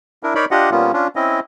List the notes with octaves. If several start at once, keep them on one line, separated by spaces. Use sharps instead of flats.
D4 E4 A#4
D#4 A#4 C#5 D5 B5
D4 F4 G4 D#5 F#5
A#2 G3 A#3 B3 C#4 F4
C#4 D4 F4
C4 C#4 E4 D#5